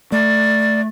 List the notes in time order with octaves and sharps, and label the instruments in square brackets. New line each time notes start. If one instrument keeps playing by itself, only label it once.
[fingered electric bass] A3 [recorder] D5